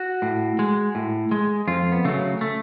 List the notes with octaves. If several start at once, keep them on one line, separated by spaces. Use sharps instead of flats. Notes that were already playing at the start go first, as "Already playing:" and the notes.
Already playing: F#4
A2
G#3
A2
G#3
F2 F4
B3
C#3 F#3 A3
A3